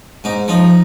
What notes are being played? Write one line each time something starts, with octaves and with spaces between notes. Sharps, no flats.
G#2 D#4
F3 D#4